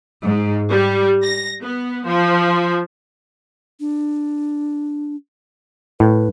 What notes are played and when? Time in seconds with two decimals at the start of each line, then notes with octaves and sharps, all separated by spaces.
0.24 G#2
0.70 G3
1.23 A#6
1.62 B3
2.07 F3
3.80 D4
6.00 A2 B4